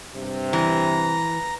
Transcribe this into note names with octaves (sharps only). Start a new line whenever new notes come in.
G2 C3
E3 A#5